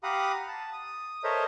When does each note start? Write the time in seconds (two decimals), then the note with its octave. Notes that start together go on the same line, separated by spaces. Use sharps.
0.03 G4 F5 F#5 A#5 B5 D#6
0.48 A5
0.73 D#6
1.24 A4 A#4 C5 C#5 D#5 E5